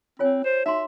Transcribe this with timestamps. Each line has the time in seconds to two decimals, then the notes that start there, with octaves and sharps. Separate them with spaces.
0.19 C4 F4 C#5 G#5
0.44 C5
0.66 D#4 F#4 E5 C6